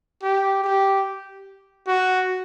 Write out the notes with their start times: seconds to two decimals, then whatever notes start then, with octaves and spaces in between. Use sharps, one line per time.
0.23 G4
0.64 G4
1.87 F#4